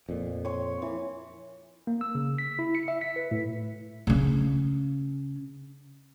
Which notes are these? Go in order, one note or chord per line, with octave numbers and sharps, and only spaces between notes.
F2 A#2
C#5 C6
E3
A#3
E6
C#3
B6
E4
C#7
E5
B6
B4
A2
C#3 C#4